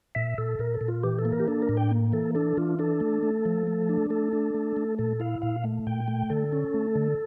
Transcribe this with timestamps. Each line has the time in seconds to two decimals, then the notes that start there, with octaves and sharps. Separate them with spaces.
0.15 A#2 E5
0.38 A#2 A4
0.59 A#2 A#4
0.74 A4
0.81 A#2
0.88 F4
1.03 E3 G4
1.19 A4
1.25 A#3
1.32 A#4
1.40 G4
1.48 D4 A4
1.62 A#4
1.69 A2
1.77 G5
1.91 A#3
2.13 E3 A4
2.35 D4 A4
2.57 E3 F4
2.79 D4 A4
3.00 A3
3.23 A3
3.45 F3
3.67 A3
3.89 D4
4.10 A3 A4
4.33 D4
4.54 A3
4.77 A3
4.99 A#2 A4
5.20 E4 F5
5.42 A#2 F5
5.64 A3
5.87 A#2 G5
6.08 A3
6.30 D3 A4
6.53 C#4
6.74 A3
6.95 D3